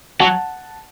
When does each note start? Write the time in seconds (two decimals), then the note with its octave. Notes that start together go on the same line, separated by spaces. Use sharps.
0.20 F#3 F#5 A5